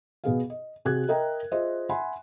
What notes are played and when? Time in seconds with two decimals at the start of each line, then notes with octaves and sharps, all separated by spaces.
0.24 B2 B3 G#4 F5
0.50 D#5
0.85 C3 F#4 G#4 F#6 G#6
1.09 A#4 D#5 E5 G5 A#5
1.52 F4 G#4 C5 D#5 E5
1.89 E5 F#5 G#5 B5 C6